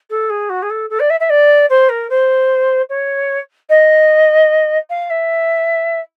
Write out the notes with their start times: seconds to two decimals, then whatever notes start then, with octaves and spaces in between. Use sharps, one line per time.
0.09 A4
0.29 G#4
0.49 F#4
0.62 G#4
0.70 A4
0.89 A4
0.99 D5
1.10 E5
1.20 E5
1.29 D5
1.69 C5
1.89 A#4
2.09 C5
2.89 C#5
3.69 D#5
4.89 F5
5.10 E5